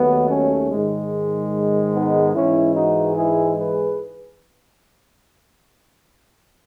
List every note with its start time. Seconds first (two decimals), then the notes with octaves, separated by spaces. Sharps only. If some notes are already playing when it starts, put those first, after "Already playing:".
Already playing: D#2 D#3 F#3 A3 B3
0.29 C#4
0.70 G#2 D#3 G#3
1.94 B3 D#4
2.34 G#2 E3 G#3 C#4 E4
2.75 D#4 F#4
3.16 E4 G#4
3.57 G#4 B4